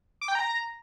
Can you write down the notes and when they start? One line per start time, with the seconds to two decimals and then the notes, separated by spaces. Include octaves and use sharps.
0.21 D6
0.28 G5
0.35 A#5